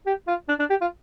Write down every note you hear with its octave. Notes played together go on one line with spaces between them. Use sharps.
G4
F4
D4
D4
G4
F4